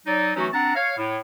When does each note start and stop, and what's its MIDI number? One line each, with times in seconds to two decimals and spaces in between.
0.06 0.31 54
0.06 0.31 63
0.06 0.31 74
0.36 0.47 52
0.36 0.47 54
0.36 0.47 57
0.36 0.47 61
0.36 0.47 63
0.36 0.47 66
0.53 0.75 60
0.53 0.75 62
0.53 0.75 78
0.53 0.75 81
0.53 0.75 82
0.76 0.93 73
0.76 0.93 77
0.97 1.18 45